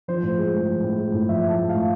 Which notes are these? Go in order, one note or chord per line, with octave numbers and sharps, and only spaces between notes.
F3 C5
A2
G#3
A2
F3
A2
G#3
A2
F3 E5
A2 A5
G#3
F5
A2